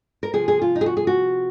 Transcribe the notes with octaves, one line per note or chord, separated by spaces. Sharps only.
A#4
C3 F3 G#4
G#4
F4
D#4
G#4
F#4
G#4
F#4